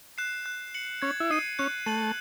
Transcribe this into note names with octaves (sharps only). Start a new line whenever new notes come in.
F#6 C7 E7
F#6
C#7 F#7
C#4 G#6
E4
D#4 C7 D#7
C#4 F#6
A3 C7 D#7 F#7